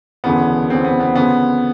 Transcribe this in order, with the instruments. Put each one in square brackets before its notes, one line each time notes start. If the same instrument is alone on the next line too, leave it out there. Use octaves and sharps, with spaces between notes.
[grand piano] E1 D2 C#3 E3 B3
E1 D2 C#3 E3 C4
B3
B3
D2 C#3 F3 B3